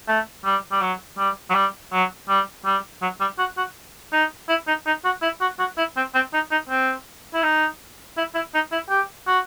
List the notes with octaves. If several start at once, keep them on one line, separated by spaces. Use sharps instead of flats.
A3
G3
G3
F#3
G3
F#3
G3
F#3
G3
G3
F#3
G3
F#4
F#4
D#4
E4
D#4
D#4
F#4
E4
F#4
F#4
E4
C4
C4
D#4
D#4
C4
E4
D#4
E4
E4
D#4
E4
G4
F#4